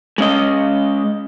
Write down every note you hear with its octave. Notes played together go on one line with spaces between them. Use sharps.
G#3 C#4 D#5